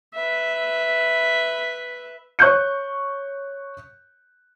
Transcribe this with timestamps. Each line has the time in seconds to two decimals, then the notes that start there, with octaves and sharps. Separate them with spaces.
0.15 B4 E5
2.39 C#5 C#6 F#6 G6 C#7